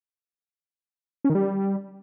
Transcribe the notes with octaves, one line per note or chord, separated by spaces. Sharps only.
C#4
D#3
G3